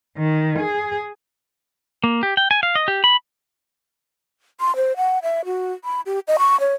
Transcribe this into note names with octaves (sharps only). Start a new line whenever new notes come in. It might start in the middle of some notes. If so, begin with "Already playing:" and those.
D#3
G#4
A#3
G4
G5
G#5
F5
D#5
G4
B5
C6
C5
F#5
E5
F#4
B5
G4
D#5
C#6
C#5